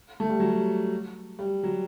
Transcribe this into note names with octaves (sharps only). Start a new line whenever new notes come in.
A3
G3
F#3
G3
G3
F#3